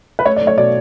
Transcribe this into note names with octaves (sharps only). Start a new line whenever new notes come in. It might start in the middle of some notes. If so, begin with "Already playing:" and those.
B4
A3 C#5
D5
A3
C#5
B2 D5